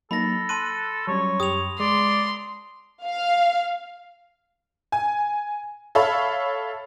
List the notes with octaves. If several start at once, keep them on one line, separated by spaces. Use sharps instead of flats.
F#3 A#3 D#4 A4 B5 A#6
A5 C6 F#6 D#7
F#3 G3 C#4 C#5
F#2 G4 C#6 D#6 F7
G#3 D5 C6
F5
G#5
A4 C#5 E5 F5 B5